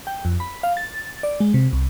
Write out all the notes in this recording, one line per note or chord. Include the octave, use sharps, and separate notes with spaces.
G5
F2
B5
F5
A6
D5
G#3
C3
C2